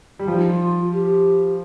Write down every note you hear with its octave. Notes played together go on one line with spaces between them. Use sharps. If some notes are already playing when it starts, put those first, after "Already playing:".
G3
F3 F4
D#4
F4
G4